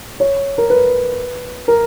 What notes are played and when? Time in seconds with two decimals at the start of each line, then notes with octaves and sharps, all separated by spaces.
0.20 C#5
0.58 A#4
0.70 B4
1.68 A#4